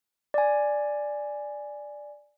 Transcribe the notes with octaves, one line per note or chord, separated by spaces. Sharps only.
D5 G#5